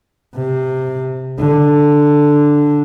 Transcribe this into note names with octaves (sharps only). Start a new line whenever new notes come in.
C3
D3